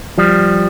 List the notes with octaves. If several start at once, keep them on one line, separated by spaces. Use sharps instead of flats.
F3 G3